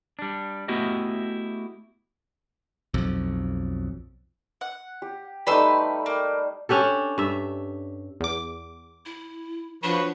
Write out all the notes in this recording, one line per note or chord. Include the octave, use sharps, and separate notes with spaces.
G3 D4
A3 B3 E4 F#4 G4 D#5
B1 F2
F#5
G4
G3 A3 D#4 B4 C6 E6
A#3
C#4 D4 G4 A4
G2 E5
E2 D6
E4
F3 D4 F#4 B4 C#5